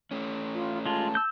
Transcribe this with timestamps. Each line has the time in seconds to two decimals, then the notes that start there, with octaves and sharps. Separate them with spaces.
0.11 A3 C#4
0.54 F4
0.86 G#3 F4 A5
1.15 E6 G6